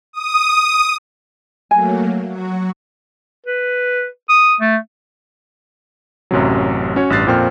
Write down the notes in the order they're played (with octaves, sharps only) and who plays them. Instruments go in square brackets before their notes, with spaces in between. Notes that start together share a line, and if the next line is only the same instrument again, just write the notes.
[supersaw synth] D#6
[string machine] F#3 A3 A#3 [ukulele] G#5
[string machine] F#3 F#4
[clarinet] B4
D#6
A3
[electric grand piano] A1 F#2 C3 F#3
C#4 F#4 C#5
A1 G2 F#6 A6 C7
F2 A#2 C5 G5 F6